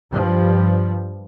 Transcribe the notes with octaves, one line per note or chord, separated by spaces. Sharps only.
G2 F3 G3